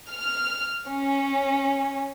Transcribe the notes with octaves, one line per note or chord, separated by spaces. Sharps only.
F6
C#4